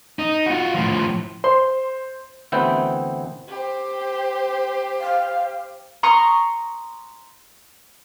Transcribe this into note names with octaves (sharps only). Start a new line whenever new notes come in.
D#4
F4 F#4
A2 F3
C5 C6
D2 E3 B3 C4 E4 G5
G4 C5
F5
A#5 C6 C#6 D#6